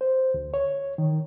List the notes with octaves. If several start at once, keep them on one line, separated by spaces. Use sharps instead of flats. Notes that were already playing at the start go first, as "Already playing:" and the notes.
C5
D2
C#5
D#3